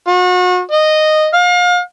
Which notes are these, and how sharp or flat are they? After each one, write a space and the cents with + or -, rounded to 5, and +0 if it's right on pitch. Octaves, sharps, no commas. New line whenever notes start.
F#4 -35
D#5 -10
F5 +35